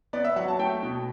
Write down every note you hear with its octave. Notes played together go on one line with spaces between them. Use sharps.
B3 D5
E5
F#3 F#5
A5
A3 G5
B2